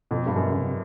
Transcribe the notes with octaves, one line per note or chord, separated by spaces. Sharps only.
F2 B2
G2
F#2
F#2 C#3
C3